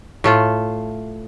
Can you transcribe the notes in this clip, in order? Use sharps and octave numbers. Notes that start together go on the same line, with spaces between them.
A2 A3 F4